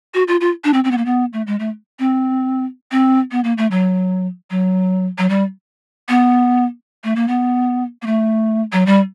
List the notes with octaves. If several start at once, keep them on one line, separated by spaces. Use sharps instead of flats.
F#4
F4
F4
D4
C4
C4
B3
A#3
B3
A3
G#3
A3
C4
C4
B3
A#3
A3
F#3
F#3
F#3
G3
B3
A3
A#3
B3
A#3
A3
F#3
G3